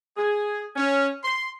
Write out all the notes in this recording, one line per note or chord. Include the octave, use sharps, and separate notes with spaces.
G#4
C#4
C6